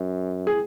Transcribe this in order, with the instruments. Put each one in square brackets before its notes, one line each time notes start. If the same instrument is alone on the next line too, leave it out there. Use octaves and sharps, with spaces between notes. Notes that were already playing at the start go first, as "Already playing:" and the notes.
Already playing: [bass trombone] F#2
[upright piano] G#4